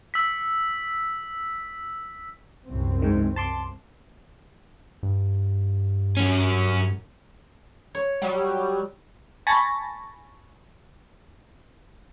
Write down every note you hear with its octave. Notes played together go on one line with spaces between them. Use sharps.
E6 B6
C2 F#2 C4
G#2 D#3
A5 C6 D6
G2
F#2 C#4
C#5
F#3 G3
G#5 A5 B5 C#6 A6 A#6